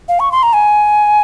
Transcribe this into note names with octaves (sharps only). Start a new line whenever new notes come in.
F5
C#6
C6
A#5
G#5